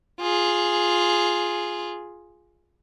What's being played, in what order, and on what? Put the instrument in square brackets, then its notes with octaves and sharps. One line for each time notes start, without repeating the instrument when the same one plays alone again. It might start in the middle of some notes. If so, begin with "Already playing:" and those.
[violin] F4 G#4